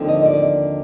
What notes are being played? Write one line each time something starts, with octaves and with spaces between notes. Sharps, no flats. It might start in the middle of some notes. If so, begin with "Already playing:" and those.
Already playing: D#2 D3 F3 C4 D#4
D#5
D5